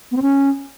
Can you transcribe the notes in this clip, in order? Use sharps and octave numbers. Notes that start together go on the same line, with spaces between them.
B3
C4
C#4